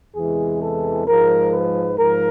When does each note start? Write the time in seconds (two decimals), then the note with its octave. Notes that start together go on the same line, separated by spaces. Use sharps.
0.16 E2 C3 E3 G#3 G#4
0.62 A4
1.07 G#2 F3 G#3 A#4
1.53 B4
1.99 G#2 F3 A#4